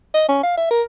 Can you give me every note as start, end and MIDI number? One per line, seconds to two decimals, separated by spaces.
0.14 0.24 75
0.29 0.41 61
0.43 0.57 77
0.57 0.68 76
0.71 0.82 70